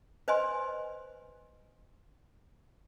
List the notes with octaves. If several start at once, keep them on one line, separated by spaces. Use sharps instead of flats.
B4 C5 D#5 G#5 C6